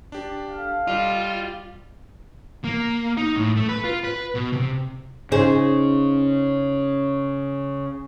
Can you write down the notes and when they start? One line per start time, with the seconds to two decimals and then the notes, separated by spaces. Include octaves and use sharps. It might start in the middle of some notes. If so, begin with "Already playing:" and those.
0.12 D4 G4
0.51 A4 F5
0.87 G3 F4 D#5
2.64 A#3
3.17 D#4
3.36 A2
3.57 A3
3.68 B4
3.84 F4
4.04 B4
4.35 B2
4.53 C3
5.32 C#3 D#4 G#4 C5